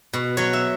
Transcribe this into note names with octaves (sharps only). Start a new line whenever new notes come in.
B2
F#3 C#5
E5